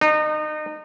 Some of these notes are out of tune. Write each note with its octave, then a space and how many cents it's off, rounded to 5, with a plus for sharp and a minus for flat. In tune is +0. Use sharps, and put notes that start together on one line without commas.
D#4 -30